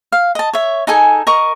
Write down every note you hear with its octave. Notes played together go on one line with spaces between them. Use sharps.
F5
D#5 A5
C#5 E5
D#4 G#4 A4 G#5
A#4 D#5 C#6